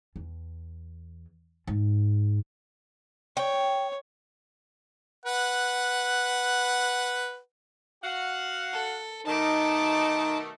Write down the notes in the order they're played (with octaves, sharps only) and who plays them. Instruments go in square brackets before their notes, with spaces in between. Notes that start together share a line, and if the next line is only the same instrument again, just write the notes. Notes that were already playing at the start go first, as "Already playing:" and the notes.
[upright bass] E2
G#2
[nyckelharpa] C#5 [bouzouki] G5
[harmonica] B4 F#5
[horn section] F#4 F5 F#5
[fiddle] A4
[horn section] B2 D#3 A3 [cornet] D#4 [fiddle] A5 D6